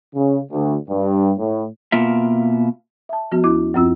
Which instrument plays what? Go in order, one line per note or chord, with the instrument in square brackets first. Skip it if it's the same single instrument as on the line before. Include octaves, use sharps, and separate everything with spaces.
[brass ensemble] C#3
D2
G2
A2
[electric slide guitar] B2 A#3 F4 E5
[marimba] E5 A5
F3 B3 F#4
D#2 E4 D6
F#2 F3 C4 F4 E6